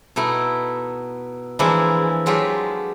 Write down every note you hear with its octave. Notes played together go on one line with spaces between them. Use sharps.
B2 A3 D#4 E4
E3 F3 G#3 A#3 D4 E4
F#3 G#3 A3 F4 G4 E5